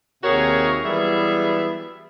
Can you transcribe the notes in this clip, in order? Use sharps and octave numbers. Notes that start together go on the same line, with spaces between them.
D#2 C3 F#4 G#4 A#4 C#5
E3 F#3 G3 B3 G#4 E5